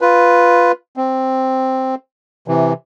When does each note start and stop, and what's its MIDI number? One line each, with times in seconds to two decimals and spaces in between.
0.01 0.72 65
0.01 0.72 71
0.97 1.95 60
2.48 2.73 48
2.48 2.73 52